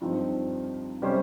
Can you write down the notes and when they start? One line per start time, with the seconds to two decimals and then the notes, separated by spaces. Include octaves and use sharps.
0.01 G2 F3 C4 D#4
1.02 C3 G3 C#4 G4 C5